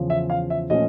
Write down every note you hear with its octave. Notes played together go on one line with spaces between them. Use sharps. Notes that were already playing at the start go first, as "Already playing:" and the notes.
Already playing: E2 C#3 F3
E5
F5
E5
A#2 F3 A3 C#4 D#5